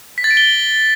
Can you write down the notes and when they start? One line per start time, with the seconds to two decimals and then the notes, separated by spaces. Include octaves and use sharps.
0.18 B6
0.24 A6
0.31 D7
0.37 G7